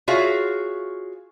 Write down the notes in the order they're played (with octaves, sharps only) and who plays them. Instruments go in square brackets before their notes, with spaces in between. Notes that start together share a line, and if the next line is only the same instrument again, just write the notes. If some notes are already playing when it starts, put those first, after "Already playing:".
[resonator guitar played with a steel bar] F4 F#4 G#4 C#5 E5 F5